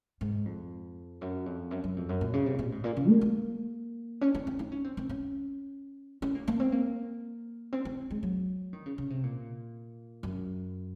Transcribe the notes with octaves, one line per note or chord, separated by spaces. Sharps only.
G#2
F2
F#2
F2
F#2
F#2
F2
F#2
A#2
C#3
C3
G#2
A#2
G#2
A#2
C#3
A#3
A#3
C#4
C4
C4
D#4
C#4
C4
C4
C#4
C#4
A#3
A#3
C4
A#3
C4
C4
G#3
F#3
D#3
C#3
C#3
C3
A#2
F#2